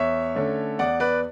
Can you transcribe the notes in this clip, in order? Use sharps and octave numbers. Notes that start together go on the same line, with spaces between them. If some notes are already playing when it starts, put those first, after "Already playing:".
Already playing: E2 C#5 E5
D3 A3 C#4
E2 D5 F#5
B4 D5